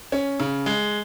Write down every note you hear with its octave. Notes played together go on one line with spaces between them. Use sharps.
C#4
C#3
G#3